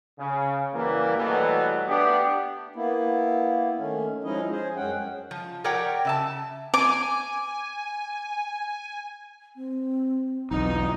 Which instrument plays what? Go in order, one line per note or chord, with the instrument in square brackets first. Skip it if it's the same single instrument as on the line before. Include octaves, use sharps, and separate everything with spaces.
[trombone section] C#3
F#2 E3 G3 A#3
B2 E3 F#3 G3 A3 B3
A3 B3 D4 G4
[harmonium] A#3 B3 E4
D#3 A3 C#4
F3 G#3 C#4 D#4 E4 D#5
G#4 C5
F#2 G#3 C#4 F#5 G5
[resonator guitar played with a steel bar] F3
G4 A#4 C#5 D5 F#5 G5
C#3 E5 A5
[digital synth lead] G#5 [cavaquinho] D6
[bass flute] C4
[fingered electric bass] B1 E2 [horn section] D#4